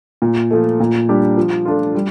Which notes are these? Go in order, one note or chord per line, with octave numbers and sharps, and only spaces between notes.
A#2
F3 A3
A#2
G3 D4 G4
F3
A3 D4 F4
G3